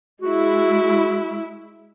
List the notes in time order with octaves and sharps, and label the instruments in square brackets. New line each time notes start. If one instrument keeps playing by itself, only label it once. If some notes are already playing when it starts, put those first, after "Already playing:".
[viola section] G#3 E4 [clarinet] F#4